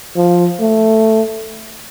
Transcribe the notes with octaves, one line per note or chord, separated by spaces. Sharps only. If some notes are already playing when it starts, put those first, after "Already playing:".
F3
A3